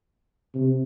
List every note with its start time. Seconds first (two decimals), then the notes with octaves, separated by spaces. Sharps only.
0.54 C3